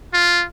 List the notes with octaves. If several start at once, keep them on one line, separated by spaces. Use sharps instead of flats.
F4